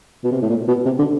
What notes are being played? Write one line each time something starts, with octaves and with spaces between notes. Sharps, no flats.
B2
C3
A2
A#2
B2
C3
D3